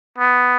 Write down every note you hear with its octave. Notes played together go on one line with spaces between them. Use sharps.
B3